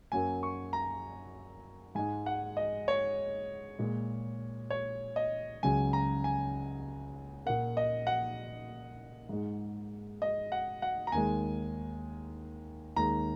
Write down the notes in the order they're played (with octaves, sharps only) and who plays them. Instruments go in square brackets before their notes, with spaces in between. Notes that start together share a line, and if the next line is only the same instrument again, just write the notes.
[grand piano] F#2 F#3 A#3 G#5
C#6
A#5
G#2 G#3 G#5
F#5
D#5
C#5
A#2 G#3
C#5
D#5
C#2 C#3 F#3 G#5
A#5
G#5
A#2 A#3 F#5
D#5
F#5
G#2 G#3
D#5
F#5
F#5
A#5
D#2 D#3 G#3 G#5
D#2 D#3 G#3 A#5